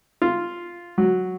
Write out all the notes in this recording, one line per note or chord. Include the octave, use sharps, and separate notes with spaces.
F4
F#3